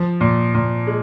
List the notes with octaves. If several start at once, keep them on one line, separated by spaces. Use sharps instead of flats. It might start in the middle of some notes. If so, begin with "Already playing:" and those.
Already playing: F3
A#2
A#2
G#3